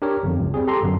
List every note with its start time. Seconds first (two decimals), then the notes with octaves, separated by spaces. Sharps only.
0.02 D4 G4 A#4 C#5
0.23 G1 F2
0.40 C#2
0.54 G3 C4 G#4
0.67 G4 A4 A#5 C6
0.82 G1 F#2